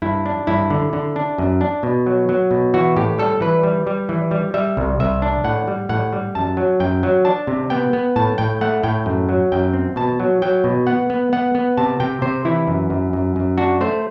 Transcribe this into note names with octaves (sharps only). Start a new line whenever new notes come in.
G2 E4
D4
G2 E4
D3
D3
D4
F#2
D4
B2
F#3
F#3
B2
E3 F#4
A2 G4
G3 A4
E3 B4
G3
G3
E3
G3
G3 E5
C2
C2 E5
D4
A2 F#5
G3
A2 F#5
G3
F#2 A5
F#3
F#2 G5
F#3
D4 A5
C3
B3 G5
B3
A2 A5
A2 G5
A3 F#5
A2 G5
F#2
F#3
F#2 G5
C4
B2 A5
F#3
F#3 G5
B2
B3 F#5
B3
B3 F#5
B3
C3 A5
C3 G5
C3 C5
E3 E4
F#2
F#2
F#2
F#2
D4 F#4
A3 C5